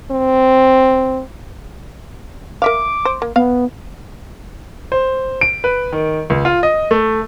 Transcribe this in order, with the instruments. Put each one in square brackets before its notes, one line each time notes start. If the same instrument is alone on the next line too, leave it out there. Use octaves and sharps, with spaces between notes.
[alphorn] C4
[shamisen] A#4 E5 F5 [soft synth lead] D6
[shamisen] C5
A#3
[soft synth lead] B3 [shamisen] F5
[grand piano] C5
D7
B4
D#3
C#2
F4
D#5
A3